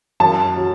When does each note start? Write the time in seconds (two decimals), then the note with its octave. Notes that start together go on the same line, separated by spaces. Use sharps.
0.20 F#2 A5
0.57 F#3